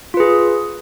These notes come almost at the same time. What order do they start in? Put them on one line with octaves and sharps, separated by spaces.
F4 B4 G#4